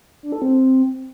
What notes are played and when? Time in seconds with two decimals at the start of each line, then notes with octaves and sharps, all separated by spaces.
0.23 D4
0.32 A4
0.42 C4